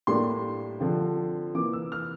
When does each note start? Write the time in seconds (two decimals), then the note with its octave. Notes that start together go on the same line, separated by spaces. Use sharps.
0.07 A2 G3 A#3 D4 C6
0.80 D3 F3 C4
1.54 C3 E3 A#3 D6
1.73 E6
1.92 F6